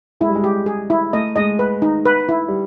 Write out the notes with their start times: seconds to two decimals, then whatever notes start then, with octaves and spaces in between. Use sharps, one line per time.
0.20 G#3 E4
0.29 G3
0.35 G#3
0.44 G4
0.66 G#4
0.90 E4
1.13 A3 D#5
1.36 G#3 D#5
1.59 B4
1.82 D#4
2.05 B4
2.29 E4
2.48 G3